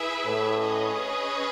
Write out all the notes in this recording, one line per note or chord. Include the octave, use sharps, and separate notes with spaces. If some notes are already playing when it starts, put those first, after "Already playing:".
Already playing: E4 G#4 B4 E5
A2
C#4 G#4 B4 D#5